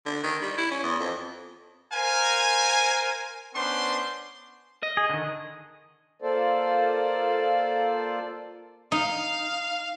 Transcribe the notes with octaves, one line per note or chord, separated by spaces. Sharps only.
D3
D#3
G3
E4
C#4
E2
F2
A#4 C5 F5 G#5
B3 C#4 D4 C5 C6
D#5
G#4
D3 D#3
A#3 F4 A4 C5 D5
D#4 F5